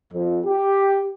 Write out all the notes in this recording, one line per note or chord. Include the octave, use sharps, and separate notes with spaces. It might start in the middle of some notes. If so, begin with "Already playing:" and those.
F2
G4